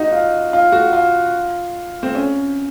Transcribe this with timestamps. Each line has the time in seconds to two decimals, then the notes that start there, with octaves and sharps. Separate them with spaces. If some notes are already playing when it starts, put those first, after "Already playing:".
Already playing: D#4 F#4
0.12 F4
0.53 F4
0.72 F#4
0.93 F4
2.03 C4
2.15 C#4